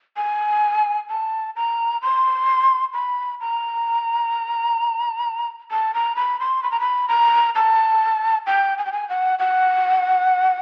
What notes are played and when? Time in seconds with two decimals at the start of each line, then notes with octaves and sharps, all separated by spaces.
0.17 G#5
1.09 A5
1.56 A#5
2.02 C6
2.93 B5
3.40 A#5
5.71 A5
5.94 A#5
6.16 B5
6.40 C6
6.63 B5
6.71 A#5
6.80 B5
7.08 A#5
7.55 A5
8.47 G5
8.78 G#5
8.85 G5
8.92 G#5
9.09 F#5
9.39 F#5